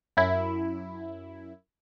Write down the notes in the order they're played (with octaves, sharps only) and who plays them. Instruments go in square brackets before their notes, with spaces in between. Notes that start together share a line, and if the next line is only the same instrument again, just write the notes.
[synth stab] F#2 E4